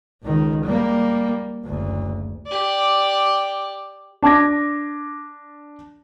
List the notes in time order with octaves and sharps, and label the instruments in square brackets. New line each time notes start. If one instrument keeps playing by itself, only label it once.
[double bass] C#2 D#3
G3 A#3
F#1 D2
[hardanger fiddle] G4 D5
[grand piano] D4 A5 D6 G#6 A#6